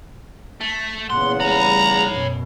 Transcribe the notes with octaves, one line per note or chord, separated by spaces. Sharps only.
A3
E2 A#2 C#3 B3 F#5 C6
G3 A3 C#5 A#5 B5
F#2 B2